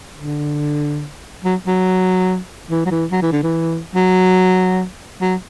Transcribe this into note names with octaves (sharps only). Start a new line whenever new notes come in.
D3
F#3
F#3
E3
F#3
E3
F#3
E3
D3
E3
F#3
F#3